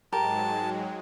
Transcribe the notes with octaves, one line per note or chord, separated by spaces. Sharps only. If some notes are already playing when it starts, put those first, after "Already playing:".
G#2 F#3 G#3 G4 A#4 A5